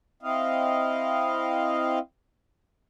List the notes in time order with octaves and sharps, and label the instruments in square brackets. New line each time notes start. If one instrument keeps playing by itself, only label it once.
[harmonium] C4 E4 D#5 F5